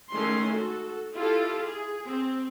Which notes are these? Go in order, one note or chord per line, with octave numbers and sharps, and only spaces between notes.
D#3 G#3 A3 C#4 E4 C6
F#4 A4
E4 F4 G4 A4
G#4
C4